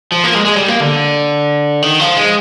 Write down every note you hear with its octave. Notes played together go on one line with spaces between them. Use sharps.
F3
A#3
G#3
G#3
G3
A#3
D3
D#3
F3
G#3